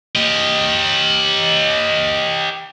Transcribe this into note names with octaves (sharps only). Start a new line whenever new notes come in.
G4 D#5